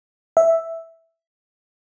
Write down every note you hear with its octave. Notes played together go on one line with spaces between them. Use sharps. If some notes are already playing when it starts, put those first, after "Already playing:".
E5